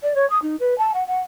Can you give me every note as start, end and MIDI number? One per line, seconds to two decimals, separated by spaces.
0.03 0.12 74
0.15 0.28 73
0.30 0.38 87
0.42 0.56 63
0.59 0.77 71
0.78 0.91 81
0.93 1.03 78
1.07 1.20 78